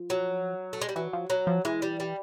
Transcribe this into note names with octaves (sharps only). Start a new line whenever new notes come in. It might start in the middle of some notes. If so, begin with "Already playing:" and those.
Already playing: F3
F#3
A3
G#3
G3
E3 F#3
F3
F#3
F3
E3 G#3
G3
G3